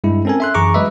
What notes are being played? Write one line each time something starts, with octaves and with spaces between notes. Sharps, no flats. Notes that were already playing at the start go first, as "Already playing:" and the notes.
G2 G#3 E4
C4 C#4 A4 A#4 G#5
E5 C6 F#6
F#2 E3 G#4 A#5 C#6 D6
F#3 G#3 B4 D#5 E5